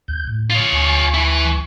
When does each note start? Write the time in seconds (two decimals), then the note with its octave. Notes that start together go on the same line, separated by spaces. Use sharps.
0.08 D#2 G6
0.27 A2
0.50 F4 C#5
0.72 D2 G#5 C#6
1.14 E3 E4